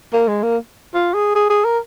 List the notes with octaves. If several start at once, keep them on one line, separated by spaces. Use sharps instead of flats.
A#3
G#3
A#3
F4
G#4
G#4
G#4
A#4